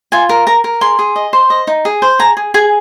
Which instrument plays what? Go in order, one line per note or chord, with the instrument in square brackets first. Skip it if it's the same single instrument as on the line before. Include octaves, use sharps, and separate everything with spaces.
[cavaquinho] F4 G#5
A#4
A#4 A#5
A#4
G#4 C6
G#4
D#5
C5
D#5
D#4
G#4
C5
G#4 A#5
G#4
G#4 G#5